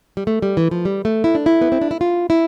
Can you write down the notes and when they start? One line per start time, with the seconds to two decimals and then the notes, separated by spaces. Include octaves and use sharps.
0.17 G3
0.27 A3
0.42 G3
0.57 E3
0.71 F3
0.85 G3
1.05 A3
1.24 E4
1.35 D4
1.46 E4
1.61 B3
1.72 C4
1.81 D4
1.91 E4
2.01 F4
2.30 E4